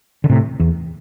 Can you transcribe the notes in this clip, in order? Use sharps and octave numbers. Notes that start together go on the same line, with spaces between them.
D3
A2 C3
E2